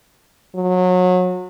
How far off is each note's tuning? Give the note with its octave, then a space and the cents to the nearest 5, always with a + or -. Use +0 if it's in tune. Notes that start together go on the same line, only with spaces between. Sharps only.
F#3 -25